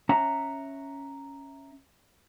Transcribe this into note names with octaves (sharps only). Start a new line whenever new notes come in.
C#4 E5 F#5 A#5